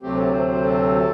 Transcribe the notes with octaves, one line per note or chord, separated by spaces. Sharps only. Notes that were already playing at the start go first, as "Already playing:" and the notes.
D2 C3 F#3 A3 C4 G4
A4
C5
C5
A4